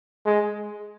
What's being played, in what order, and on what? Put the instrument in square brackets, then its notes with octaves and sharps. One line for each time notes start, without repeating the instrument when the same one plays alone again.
[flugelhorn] G#3